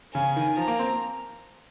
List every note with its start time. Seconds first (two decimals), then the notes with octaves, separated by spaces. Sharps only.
0.14 C#3 G#5
0.36 D#3
0.57 F3 A#5
0.68 A#3
0.79 C4